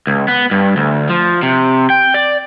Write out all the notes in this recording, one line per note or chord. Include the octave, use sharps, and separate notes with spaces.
C#2
B3
G2
D2
F3
C3
G5
D5